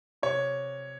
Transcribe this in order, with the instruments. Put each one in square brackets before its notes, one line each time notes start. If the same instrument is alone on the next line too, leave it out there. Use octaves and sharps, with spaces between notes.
[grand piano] C3 C#5